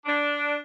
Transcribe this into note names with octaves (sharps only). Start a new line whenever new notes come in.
D4